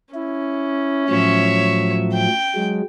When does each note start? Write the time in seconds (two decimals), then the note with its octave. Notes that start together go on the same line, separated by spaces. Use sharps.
0.15 C#4 E4
1.10 A2 F3 F#3 C#5 E5
2.13 G5
2.55 F#3 G#3